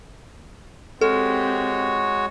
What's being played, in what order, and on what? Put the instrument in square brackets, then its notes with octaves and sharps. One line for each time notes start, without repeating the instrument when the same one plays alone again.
[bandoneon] G#3 F#4 C#5 [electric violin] C4 G4 [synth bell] A4